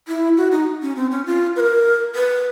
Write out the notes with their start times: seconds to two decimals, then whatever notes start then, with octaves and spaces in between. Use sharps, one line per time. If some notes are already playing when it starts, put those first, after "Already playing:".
0.08 E4
0.37 F#4
0.52 D#4
0.82 C#4
0.96 C4
1.12 C#4
1.26 F4
1.56 B4
1.60 A#4
2.15 B4